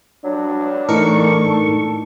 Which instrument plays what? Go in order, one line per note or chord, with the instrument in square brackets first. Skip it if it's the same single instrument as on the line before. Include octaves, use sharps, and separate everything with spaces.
[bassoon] F#3 [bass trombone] D4
[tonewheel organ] A2 C#6 [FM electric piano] E3 D#4 A#4 [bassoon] A4